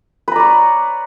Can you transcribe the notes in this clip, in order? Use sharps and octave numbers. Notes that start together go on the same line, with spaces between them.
B4 C#5 D5 A#5